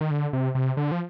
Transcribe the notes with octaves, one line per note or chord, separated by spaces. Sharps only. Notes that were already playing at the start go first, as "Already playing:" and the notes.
D#3
D3
C3
C3
D3
F3